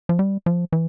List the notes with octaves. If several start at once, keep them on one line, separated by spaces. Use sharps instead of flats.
F3
G3
F3
E3